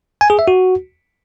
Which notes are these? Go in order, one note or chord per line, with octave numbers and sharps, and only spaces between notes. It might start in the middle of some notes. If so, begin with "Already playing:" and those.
G#5
G#4
E5
F#4